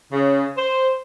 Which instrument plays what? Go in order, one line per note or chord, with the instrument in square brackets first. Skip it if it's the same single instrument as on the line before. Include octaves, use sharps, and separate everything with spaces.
[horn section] C#3
C5